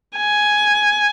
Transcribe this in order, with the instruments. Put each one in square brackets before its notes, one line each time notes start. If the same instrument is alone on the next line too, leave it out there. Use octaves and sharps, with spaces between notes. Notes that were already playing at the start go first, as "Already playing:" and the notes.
[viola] G#5